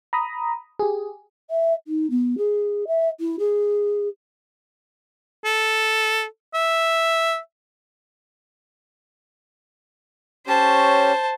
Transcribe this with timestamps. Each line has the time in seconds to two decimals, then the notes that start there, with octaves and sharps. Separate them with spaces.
0.13 A#5 B5 D#6
0.79 G4 G#4
1.50 E5
1.87 D#4
2.10 B3
2.37 G#4
2.87 E5
3.20 E4
3.39 G#4
5.45 A4
6.54 E5
10.47 C#4 G4 C5 C#5 A5